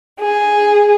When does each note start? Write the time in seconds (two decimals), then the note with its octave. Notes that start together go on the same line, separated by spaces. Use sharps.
0.20 G#4